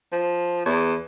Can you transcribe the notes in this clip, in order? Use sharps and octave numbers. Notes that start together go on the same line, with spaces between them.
F3
E2